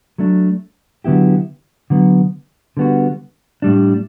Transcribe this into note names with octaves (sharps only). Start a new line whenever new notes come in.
F#3 A3 D4
D3 F#3 B3 E4 G4
D3 F#3 B3
D3 G3 B3 F#4
A2 G3 D4